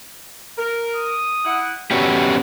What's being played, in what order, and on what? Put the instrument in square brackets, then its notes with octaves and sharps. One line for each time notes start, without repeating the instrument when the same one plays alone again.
[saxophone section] A#4
[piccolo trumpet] D#6
[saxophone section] E4 F#5
[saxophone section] A#2 D3 F#4 [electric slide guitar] B3 C#4 G4 [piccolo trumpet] A4